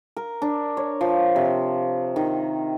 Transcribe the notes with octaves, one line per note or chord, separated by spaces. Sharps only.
A#4
D4
C#5
F3
C3
D#3